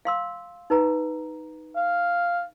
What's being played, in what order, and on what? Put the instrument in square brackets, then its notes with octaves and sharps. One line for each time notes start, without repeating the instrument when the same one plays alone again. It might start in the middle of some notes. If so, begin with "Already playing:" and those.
[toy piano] F5 C6 E6
D#4 B4 A#5
[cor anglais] F5